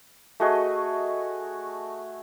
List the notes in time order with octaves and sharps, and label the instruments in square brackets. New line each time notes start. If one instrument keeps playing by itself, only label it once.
[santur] A3 F#4 G#4 D#5